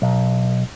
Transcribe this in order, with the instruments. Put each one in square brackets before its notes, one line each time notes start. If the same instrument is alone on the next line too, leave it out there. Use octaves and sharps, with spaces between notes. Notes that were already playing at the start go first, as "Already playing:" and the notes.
[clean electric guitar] B1